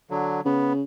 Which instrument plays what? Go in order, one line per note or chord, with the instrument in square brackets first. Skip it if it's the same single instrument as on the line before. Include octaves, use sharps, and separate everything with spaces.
[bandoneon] D3 F#3
[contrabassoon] C#3 [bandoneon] B3